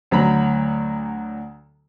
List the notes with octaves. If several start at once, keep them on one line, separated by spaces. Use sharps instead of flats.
D2 F#3 A#5 B5